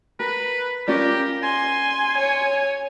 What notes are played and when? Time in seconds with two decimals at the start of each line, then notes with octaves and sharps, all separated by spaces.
0.20 A#4 B4
0.88 C#4 F4 G4 A#4 D5
1.43 G#5 C6
2.18 C#5